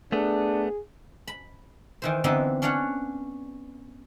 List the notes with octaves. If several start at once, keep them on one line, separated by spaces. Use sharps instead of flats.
A3 B3 D4 G#4
B5
D#3 E3 C5
D3 E3 B3 C4 D#4 E4
C#4 D4 C#5 D5 F5 F#5